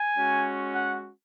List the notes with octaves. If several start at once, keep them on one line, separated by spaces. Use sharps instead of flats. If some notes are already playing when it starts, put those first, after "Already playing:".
Already playing: G#5
G#3 C#4 F#4
F#5